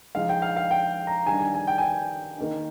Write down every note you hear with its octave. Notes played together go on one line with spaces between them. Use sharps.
F3 G#3 D#4 F5
G5
F5
F5
G5
A#5
D#3 G3 D4 G#5
G#5
G#5
G5
G#5
G5
D#3 A#3 D#4